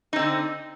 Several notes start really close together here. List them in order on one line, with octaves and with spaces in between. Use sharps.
D#4 C4 D3